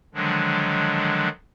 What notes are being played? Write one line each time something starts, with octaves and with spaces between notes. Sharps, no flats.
D3 D#3 F3 F#3 G#3 D4